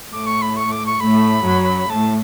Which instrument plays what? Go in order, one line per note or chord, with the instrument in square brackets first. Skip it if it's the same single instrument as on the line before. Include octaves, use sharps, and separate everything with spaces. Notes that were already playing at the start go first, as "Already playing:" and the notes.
[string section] A2 A3 [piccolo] D6
[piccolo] C#6
B5
C#6
D6
C#6
[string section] A2 A3 [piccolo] B5
[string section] F#2 F#3
[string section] A2 A3 [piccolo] A5